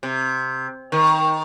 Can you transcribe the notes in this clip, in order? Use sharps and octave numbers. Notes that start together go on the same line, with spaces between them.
C3
D#3